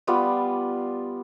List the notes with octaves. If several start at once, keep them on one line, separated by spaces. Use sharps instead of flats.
G3 B3 F4 D5